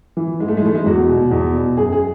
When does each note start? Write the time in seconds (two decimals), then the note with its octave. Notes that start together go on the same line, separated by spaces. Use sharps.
0.17 E3
0.40 G#2 G#3
0.48 A3
0.57 G#3
0.63 E3 A3
0.75 G#3
0.86 E2 F#4
1.09 B2
1.31 E2
1.54 B2
1.77 F#2 G#4
1.92 G#4